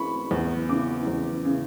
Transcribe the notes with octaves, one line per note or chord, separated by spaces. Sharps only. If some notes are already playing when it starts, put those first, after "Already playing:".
Already playing: E3 B5 C#6
E2
C#3 E3 D6
E2
C#3 E3